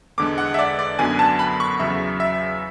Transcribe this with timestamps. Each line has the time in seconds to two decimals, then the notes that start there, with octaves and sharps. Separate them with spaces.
0.18 E2 D3 G#3 D6
0.38 F#5
0.54 E5
0.59 D5
0.79 D5
0.99 F#2 D3 F#3 B3 G#5
1.19 A5
1.39 B5
1.60 C#6
1.80 E2 C#3 F#3 E5
2.20 E5